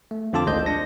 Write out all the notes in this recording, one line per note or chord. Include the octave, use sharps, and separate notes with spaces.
A3
F2 D3 F4 A4 A5 D6
G#1 D2 G#3 C5 D#5 G6
D4 A#6